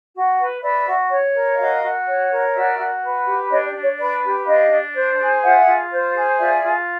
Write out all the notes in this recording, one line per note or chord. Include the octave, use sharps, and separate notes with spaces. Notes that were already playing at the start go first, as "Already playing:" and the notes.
F#4
B4
B4 D5 E5
F#4
C#5
A#4
E5
F#4 D#5 F5
F#4
C#5
A#4
F#4 D5 E5
F#4
B4
G4
D4 C#5 D#5
D5
D4
C#5
B4 D5
G4
D4 D#5 F5
D4
C5
G#4
F4 E5 F#5
F4
C5
G#4
F4 D5 E5
F4